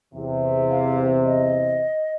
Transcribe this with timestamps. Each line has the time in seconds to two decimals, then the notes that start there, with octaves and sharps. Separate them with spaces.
0.14 E2 C3
0.70 F5
1.25 D#5